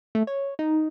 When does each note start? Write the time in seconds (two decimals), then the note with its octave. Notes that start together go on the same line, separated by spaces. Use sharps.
0.15 A3
0.27 C#5
0.59 D#4